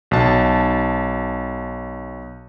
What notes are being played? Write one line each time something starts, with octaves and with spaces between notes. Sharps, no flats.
B1 A5